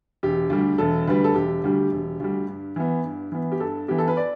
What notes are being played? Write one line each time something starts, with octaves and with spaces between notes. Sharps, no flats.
E1 G4
D2 D3 G3
E1 A4
D2 D3 G3 B4
A4
E1 G4
D2 D3 G3
E1
D2 D3 G3
G2
E3 B3
G2
E3 B3
G4
G2 A4
E3 B3 G4
A4
B4
D5